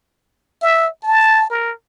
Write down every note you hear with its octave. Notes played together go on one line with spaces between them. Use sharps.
E5
A5
A#4